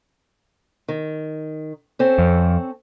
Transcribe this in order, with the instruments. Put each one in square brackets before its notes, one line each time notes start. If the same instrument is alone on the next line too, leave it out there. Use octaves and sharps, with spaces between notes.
[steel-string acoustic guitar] D#3
C4 C#4 A4
[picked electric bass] F2